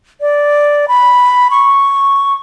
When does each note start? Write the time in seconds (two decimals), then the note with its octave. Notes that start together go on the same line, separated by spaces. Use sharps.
0.21 D5
0.88 B5
1.51 C#6